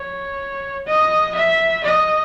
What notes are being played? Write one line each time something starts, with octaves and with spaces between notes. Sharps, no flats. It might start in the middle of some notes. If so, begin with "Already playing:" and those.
Already playing: C#5
D#5
E5
D#5